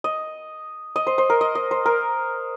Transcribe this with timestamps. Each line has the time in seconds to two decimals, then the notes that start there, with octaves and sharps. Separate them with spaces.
0.04 D#5
0.96 D#5
1.07 C5
1.18 C5
1.30 A#4
1.41 D#5
1.55 D#5
1.71 C5
1.86 A#4